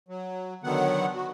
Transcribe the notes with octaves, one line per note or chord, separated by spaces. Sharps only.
F#3
D3 D#3 F#3 B3 F#5
F#4